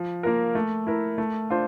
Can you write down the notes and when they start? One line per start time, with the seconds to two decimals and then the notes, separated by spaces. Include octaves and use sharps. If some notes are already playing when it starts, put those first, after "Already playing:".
Already playing: F3
0.23 A#3 F4 A#4
0.55 A3
0.87 E4 A#4
1.18 A3
1.50 D4 F4 C5